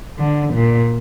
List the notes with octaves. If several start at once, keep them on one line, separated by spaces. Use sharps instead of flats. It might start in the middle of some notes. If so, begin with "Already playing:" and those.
D3
A#2